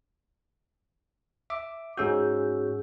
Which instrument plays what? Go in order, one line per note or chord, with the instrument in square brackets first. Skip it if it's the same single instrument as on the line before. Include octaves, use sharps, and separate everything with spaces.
[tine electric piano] E5 D6
[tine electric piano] G#2 C#4 F#4 [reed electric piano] G#4 E6 G6